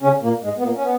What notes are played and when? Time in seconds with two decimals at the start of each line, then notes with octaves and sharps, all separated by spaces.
0.02 C#3 C#4
0.22 A#2 A#3
0.43 G#2 G#3
0.58 B3
0.63 A#2 A#3
0.76 C#4
0.83 B3